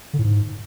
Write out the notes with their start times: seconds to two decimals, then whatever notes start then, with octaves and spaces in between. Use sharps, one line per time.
0.13 D3
0.19 A2
0.24 G#2